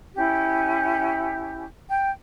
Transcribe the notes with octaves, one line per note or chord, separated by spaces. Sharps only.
C#4 E4 G4
G5